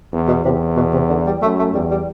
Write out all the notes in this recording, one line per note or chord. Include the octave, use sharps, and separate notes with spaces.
E2
B2
E2 C3
B2
C3
D3
G3
F#2 A3
A3
E2 G3
G3